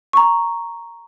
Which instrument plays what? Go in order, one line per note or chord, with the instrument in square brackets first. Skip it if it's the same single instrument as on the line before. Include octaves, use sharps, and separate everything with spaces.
[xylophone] A#5 C#6